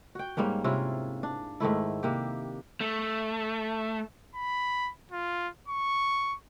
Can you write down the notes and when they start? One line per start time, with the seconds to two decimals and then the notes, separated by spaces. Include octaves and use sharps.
0.15 F#4 G5
0.37 G#2 G3 A#3 C#4
0.64 C3 C#4 E4 F4
1.23 D4
1.60 G#2 D#3 A3 E4
2.03 C3 A#3 G4
2.81 A3
4.35 B5
5.11 F4
5.68 C#6